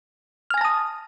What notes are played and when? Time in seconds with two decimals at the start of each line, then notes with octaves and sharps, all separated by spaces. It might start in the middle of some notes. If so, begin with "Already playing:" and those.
0.50 F6
0.54 G#5
0.58 A#6
0.61 A5
0.65 D#6